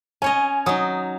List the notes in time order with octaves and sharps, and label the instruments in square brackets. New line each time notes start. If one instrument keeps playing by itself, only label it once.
[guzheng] C#4 C#5 D#5 [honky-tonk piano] G#5
[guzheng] F#3 D#4 [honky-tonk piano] D#6